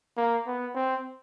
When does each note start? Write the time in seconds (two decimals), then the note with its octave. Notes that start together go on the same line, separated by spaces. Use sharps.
0.17 A#3
0.46 B3
0.75 C4